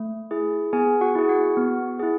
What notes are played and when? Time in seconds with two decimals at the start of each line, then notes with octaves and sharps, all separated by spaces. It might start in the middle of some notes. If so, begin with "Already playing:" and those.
Already playing: A3
0.31 E4 G#4
0.73 B3 G#4 G#5
1.01 F#4 F#5
1.15 E4 G#4
1.29 F#4 F#5
1.57 B3
1.99 E4 G#4